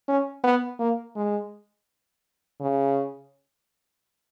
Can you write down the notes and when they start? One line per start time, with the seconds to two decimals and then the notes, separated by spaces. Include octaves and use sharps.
0.08 C#4
0.44 B3
0.80 A#3
1.16 G#3
2.61 C#3